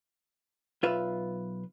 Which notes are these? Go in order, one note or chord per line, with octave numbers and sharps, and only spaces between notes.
B1 F4 B4 E5